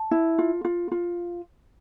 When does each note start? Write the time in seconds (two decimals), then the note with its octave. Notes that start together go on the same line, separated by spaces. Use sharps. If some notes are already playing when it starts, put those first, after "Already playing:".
Already playing: A5
0.11 E4
0.38 F4
0.65 F4
0.91 F4